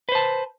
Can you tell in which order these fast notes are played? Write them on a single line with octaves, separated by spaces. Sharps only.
B4 C5 A5